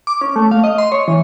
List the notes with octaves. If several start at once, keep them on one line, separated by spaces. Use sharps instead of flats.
D6
C#4
A3
F5
D#5
C6
C#5
E3